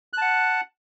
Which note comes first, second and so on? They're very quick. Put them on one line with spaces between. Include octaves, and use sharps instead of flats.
F#6 A5 F#5